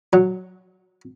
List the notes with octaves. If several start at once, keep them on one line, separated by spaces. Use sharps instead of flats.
F#3